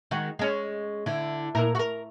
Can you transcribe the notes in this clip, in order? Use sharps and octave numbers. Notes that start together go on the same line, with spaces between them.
D#3 G#3 F#4
G#3 C#4
D3 E4
A#2 E4 A#4
F#4 A#4